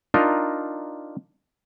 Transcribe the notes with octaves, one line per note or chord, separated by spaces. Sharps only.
D4 D#4 F4 A#4 D#5